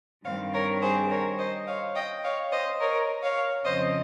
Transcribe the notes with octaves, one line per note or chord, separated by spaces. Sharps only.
G2 D#3 G3 C4 C#5 F5
A#4 C#5
G#4 C5
A#4 C#5
C5 D#5
C#5 F5
D#5 G5
C#5 F5
C5 D#5
A#4 C#5
C#5 F5
F2 C#3 F3 C4 C5 D#5